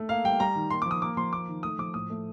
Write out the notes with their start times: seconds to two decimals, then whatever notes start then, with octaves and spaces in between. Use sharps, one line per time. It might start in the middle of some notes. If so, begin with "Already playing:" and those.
Already playing: A3
0.09 A#3 F5
0.24 G3 G5
0.40 G3 A#5
0.55 D#3
0.70 A#3 C6
0.82 D6
0.86 F3
0.91 D#6
1.02 A#3 D6
1.17 F3 C6
1.32 A#3 D6
1.48 D#3
1.63 A3 D#6
1.78 F3 D6
1.94 A2 D#6
2.10 A3